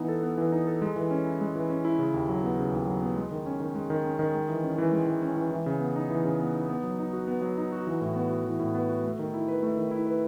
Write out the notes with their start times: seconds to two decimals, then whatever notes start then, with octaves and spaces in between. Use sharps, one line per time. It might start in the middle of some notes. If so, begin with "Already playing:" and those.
Already playing: E3 B3 D#4
0.09 A4
0.23 B3
0.38 E3
0.52 D#4
0.67 A4
0.82 G#3
0.96 E3
1.11 C#4
1.26 E4
1.41 G#3
1.55 E3
1.70 C#4
1.85 E4
1.99 C#3
2.14 D#2
2.28 F#3
2.43 B3
2.58 C#3
2.72 D#2
2.87 F#3
3.02 B3
3.16 G#3
3.31 D#3
3.46 C#4
3.60 D#3
3.75 G#3
3.90 D#3
4.05 C#4
4.19 D#3
4.34 G#3
4.49 E3
4.64 C#4
4.78 E3
4.92 G#3
5.07 E3
5.22 C#4
5.37 E3
5.51 E3
5.66 C#3
5.80 B3
5.96 D#4
6.10 E3
6.25 C#3
6.40 B3
6.55 D#4
6.69 B3
6.84 F#3
6.99 D#4
7.13 F#4
7.28 B3
7.42 F#3
7.58 D#4
7.72 F#4
7.87 E3
8.01 A2
8.16 B3
8.30 F#4
8.45 E3
8.60 A2
8.75 B3
8.90 F#4
9.04 A3
9.19 D#3
9.34 E4
9.48 B4
9.63 A3
9.77 D#3
9.91 E4
10.07 B4